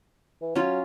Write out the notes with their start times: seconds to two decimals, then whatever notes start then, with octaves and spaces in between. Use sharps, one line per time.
0.41 E3
0.55 F#3 C#4 F4